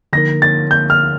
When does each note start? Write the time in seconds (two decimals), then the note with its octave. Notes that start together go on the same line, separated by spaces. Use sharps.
0.13 D3 F3 A#3 D#4 A#4 A#6
0.42 A6
0.71 G6
0.90 F6